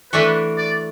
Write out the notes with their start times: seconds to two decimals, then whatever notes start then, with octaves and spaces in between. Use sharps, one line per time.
0.13 E3 A3 D4 F#4 B4
0.58 D5